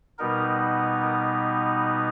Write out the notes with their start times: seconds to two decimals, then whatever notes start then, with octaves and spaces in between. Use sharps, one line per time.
0.19 B2 G3 B3 D#4 A#4
1.02 A#4